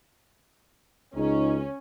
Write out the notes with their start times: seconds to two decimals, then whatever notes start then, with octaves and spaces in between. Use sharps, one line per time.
1.16 C#2 C#4 D#4 G#4